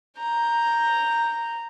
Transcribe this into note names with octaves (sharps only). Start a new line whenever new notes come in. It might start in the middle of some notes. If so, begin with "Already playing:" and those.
A#5 G6